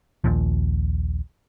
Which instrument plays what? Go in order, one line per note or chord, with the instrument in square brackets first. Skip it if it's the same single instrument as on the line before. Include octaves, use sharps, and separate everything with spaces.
[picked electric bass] A#1 D#2 A#2 F3